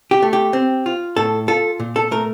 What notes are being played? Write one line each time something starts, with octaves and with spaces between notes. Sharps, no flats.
G4
A3
G4
C4
F4
A2 A4
F4 A4
A#2
A4
A3 A#4